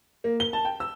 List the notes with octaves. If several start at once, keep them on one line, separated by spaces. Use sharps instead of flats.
A#3
G7
A5
G5
E6